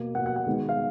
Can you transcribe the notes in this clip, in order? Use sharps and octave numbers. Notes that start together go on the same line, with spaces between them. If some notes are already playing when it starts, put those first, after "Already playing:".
Already playing: B2 A#3
B2 A#3 F#5
F#5
F#5
D#3 G#3 B3
F5